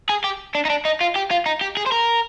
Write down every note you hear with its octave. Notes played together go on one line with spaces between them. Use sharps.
G#4
G4
D4
D#4
D4
D#4
F4
G4
F4
D#4
G4
G#4
C5
A#4